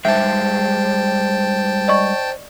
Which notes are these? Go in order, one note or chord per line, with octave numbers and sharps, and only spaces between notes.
G2 G#3 C5 E5 G5 A5
D5 D#5 C#6